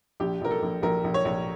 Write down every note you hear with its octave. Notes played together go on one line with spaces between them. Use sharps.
A#1 G4
A#1 A#4
A4
A#1
A#1 A#4
A#1
C#5
A#1